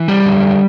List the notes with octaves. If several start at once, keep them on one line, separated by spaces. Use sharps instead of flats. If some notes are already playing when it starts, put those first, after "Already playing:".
Already playing: E3
G3 G4
F2 D3